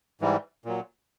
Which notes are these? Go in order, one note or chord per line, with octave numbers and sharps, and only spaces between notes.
G#2 E3 G3
A#2 F#3